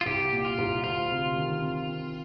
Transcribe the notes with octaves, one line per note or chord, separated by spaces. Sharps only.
F4
C2 G4
A#2
F4
C2
D2 F4
C3
D#3
C4
C4